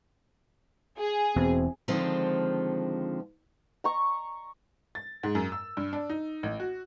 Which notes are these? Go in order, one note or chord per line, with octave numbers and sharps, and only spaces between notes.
G#4
E1 E2 B2 C4
D3 D#3 F3 G#3 C4 F4
A#5 C#6
A6
G#2
F#2
E6
G2
D4
D#4
A1
F#4